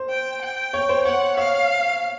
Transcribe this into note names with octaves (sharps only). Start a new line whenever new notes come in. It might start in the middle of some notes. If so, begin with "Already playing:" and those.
Already playing: C5
G5
G5
C#5
C5
C#5 F#5
C#5 F5